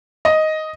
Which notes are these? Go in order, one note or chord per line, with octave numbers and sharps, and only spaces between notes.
D#5